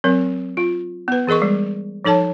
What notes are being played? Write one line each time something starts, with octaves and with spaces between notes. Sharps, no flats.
F#3 C4 A#4
F4
B3 B4
E3 G#4 A#4 D#5 C#6
G3 G#3
F3 D#4 A4 C#5 A5